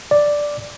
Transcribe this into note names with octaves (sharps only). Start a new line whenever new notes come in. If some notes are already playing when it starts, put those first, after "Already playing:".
D5